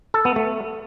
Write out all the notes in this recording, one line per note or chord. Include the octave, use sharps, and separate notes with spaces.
A4
B3
A3